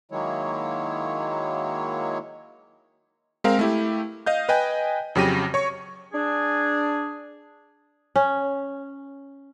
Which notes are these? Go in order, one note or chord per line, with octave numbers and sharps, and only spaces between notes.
D#3 F#3 G#3 A#3 E4 C#5
G#3 C4 A#4 F5
A3 E4 G4
D#5 F5 G6
B4 D#5 G5 G#5
F2 C#3 F#3 G4 A#6 D#7
C#5 C#6
D4 G#4
C#4